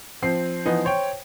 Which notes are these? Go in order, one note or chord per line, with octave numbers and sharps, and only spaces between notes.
F3 C4 C7
E3 F3 B3 D#4
C5 C#5 G5